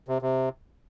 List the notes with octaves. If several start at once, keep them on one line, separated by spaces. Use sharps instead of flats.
C3
C3